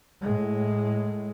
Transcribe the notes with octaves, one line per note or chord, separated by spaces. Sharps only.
A2 G#3